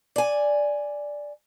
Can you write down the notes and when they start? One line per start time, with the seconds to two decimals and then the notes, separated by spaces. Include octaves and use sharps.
0.16 D5 G#5